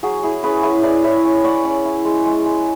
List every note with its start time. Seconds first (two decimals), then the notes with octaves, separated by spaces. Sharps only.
0.03 F#3 G#4
0.23 E4 G#4
0.43 C#4 G#4 B4
0.63 E4 G#4
0.83 E4 B4 D5
1.04 E4 C#5 E5
1.25 C#4
1.44 C#4 D5 F#5
1.65 C#4
1.85 E4
2.05 G#3
2.26 G#3
2.45 G#3